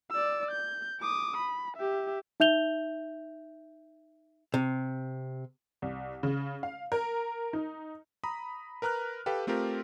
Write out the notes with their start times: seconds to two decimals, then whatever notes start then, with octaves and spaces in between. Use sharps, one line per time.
0.11 D5 E6
0.51 G6
1.01 D6 D#6
1.37 B5
1.77 G4 E5
2.40 D#4 E5 G6 F7 G7
4.54 C3
5.82 C2
6.23 C#3
6.63 F5
6.92 A#4
7.53 D#4
8.24 A#5 B5 D#6
8.82 A#4 B4 A#5 F6 F#6
9.26 G4 A4 B4 F5 G5
9.47 A3 C4 F4 G4 A#4